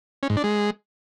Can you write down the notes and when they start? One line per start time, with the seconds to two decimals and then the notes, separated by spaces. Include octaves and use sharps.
0.23 C#4
0.30 G#2
0.37 D4
0.44 G#3